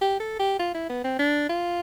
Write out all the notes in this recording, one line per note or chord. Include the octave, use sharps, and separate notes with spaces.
G4
A4
G4
F4
E4
B3
C4
D4
F4